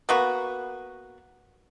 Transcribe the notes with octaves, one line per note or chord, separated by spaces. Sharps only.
A#3 B3 F#4